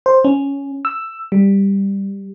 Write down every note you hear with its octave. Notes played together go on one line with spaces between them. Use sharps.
C5
C#4
E6
G3